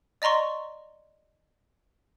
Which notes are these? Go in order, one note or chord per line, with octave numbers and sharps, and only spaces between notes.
D5 D#5 A#5 C6 C#6